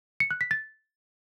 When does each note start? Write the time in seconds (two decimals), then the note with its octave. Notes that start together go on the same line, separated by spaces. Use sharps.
0.20 C#7
0.31 F#6
0.41 B6
0.51 A6